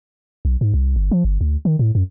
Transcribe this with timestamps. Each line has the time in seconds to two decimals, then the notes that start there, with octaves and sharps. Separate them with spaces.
0.45 B1
0.61 G#2
0.74 C2
0.96 G1
1.11 F3
1.25 G1
1.41 D2
1.65 D#3
1.79 A2
1.95 F#2